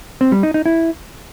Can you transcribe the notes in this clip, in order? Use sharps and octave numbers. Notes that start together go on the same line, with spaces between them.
C4
G3
D#4
D#4
E4